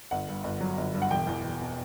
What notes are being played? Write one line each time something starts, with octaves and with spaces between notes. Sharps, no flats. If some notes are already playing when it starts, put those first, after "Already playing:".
G1 F#5
G2
G1
F#3
G1
G2
F#5
E1 G5
E2
E1
B2